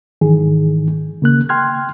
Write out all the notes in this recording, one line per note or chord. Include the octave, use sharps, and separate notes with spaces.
G#2 D#3 E3 G#4
C#3 A#3 F#6
G5 C6 F6 F#6 G#6